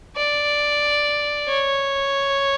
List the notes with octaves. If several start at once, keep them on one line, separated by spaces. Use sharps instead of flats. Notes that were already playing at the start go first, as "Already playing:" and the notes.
D5
C#5